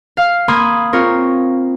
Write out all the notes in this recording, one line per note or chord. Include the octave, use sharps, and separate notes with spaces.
F5 F6
A#3 B5 C6 D#6 G#6
C4 F4 A#4 C#5